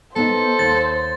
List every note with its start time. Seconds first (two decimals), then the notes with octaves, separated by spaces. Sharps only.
0.16 B3 D#4 A4 C5
0.59 D#2 A6